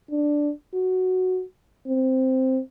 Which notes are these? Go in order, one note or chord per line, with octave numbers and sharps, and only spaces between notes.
D4
F#4
C4